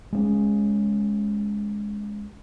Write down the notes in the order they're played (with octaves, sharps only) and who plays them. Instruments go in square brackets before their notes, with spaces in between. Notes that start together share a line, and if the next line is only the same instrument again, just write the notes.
[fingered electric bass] G#3 C4 C#4